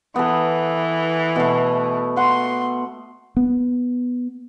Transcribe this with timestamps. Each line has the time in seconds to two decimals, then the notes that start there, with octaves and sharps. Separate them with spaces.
0.16 E3 B3 A4
1.36 B2 A3
2.17 F#5 C6
3.37 B3